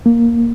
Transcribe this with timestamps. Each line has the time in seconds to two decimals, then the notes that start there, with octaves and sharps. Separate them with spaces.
0.06 A#3